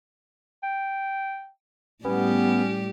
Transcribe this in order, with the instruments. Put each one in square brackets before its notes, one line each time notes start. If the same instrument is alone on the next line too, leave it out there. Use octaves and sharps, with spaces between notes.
[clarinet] G5
[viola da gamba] A2 G3 G4 [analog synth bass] B3 [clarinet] C#4